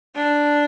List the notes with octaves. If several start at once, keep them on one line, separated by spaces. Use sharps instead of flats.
D4